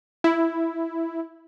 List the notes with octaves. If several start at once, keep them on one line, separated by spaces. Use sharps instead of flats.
E4